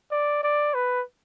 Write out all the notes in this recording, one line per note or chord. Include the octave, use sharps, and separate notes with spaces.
D5
D5
B4